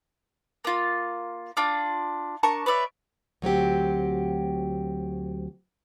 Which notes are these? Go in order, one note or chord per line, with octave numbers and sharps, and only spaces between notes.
A#3 F4
D4 F4 D6
D4 A#4 A5 C#6
B4 C#5 D5 E5
D2 F#3 C4 G4